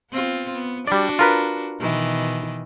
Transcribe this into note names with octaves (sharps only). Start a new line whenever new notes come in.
B3 C4 F4
B3
G3 D4 F#4 D5
F4 A#4 B4
B2 D#3 E3